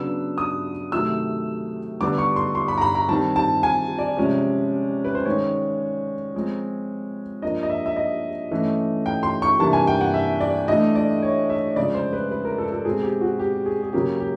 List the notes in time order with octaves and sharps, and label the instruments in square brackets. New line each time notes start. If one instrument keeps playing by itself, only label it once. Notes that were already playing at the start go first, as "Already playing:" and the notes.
Already playing: [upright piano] C#3 F#3 B3 D4 E6
D#6
C3 D#3 F#3 A3 E6
D3 G3 B3 D4 D6
C#6
C6
C6
B5
A#5
B5
A#5
D#3 G3 C4 A5
A5
G#5
D5
C3 F3 G#3 C#4
B4
C5
D#3 G#3 C#4 C#5
F3 G#3 C4
F3 A#3 D4 D#5
D#5
E5
E5
D#5
E3 A3 C#4
G5
C6
C#6
C3 E3 G3 A#3 D4 A5
G#5
G5
F#5
E5
D5
A2 E3 A3 D4 D#5
D5
C#5
E5
C#3 F3 G#3 D5
C5
B4
B4
A#4
A4
A4
B2 G#3 C4 G#4
G4
F#4
G4
G#4
G#4
C#3 F#3 A#3 C#4 G4
G4